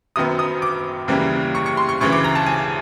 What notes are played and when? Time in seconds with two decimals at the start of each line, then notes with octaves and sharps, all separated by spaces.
0.16 F#1 F#2 D#3 F#3 B3 D#6
0.39 D#6
0.62 D6
1.08 D#2 C#3 E3 G3 A#3
1.55 C#6
1.66 C#6
1.77 C6
1.89 C#6
2.01 D2 C#3 E3 C#6
2.12 D6
2.24 A#5
2.35 A5
2.46 G#5